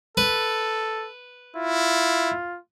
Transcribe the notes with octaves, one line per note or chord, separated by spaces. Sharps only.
A4 B4
E4 F4